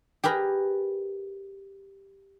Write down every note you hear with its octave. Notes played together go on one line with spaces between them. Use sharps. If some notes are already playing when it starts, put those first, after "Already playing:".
G4 G#4 A#4 B4 B5